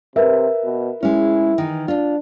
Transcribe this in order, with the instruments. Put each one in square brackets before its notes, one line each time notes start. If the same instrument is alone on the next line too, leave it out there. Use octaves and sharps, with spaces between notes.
[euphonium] C3 [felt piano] A#4 B4 E5
[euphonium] B2
[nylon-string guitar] G#3 C#4 [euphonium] E4
[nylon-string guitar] D#3 E3
[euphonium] D4 [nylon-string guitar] F4